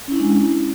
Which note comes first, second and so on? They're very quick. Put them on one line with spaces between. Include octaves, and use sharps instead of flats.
C#4 E4 D4 G#3